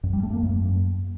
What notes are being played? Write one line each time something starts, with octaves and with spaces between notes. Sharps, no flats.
F#2
G3
A3
A#3
F#2